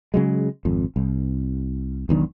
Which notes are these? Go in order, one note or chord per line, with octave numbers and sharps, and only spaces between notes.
C#3 F#3 G#3
G#1 F2
C2
E1 B1 D#3 D4